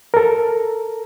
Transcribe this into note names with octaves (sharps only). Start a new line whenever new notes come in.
A4 A#4